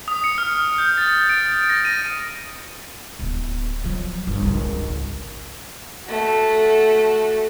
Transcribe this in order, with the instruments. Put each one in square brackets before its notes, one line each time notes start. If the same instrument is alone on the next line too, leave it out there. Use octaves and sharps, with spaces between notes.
[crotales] D#6
C#7
F6
G6
A6
D7
A#6
D#7
[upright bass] D1 B3
F3 F#3
G1
G#1 C#2
[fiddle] A3 F#4